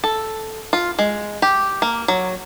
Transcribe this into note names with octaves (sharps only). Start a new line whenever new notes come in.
A4
F4
G#3
G4
A#3
F#3